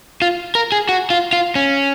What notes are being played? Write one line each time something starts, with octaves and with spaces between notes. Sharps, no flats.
F4
A#4
G#4
F#4
F4
F4
C#4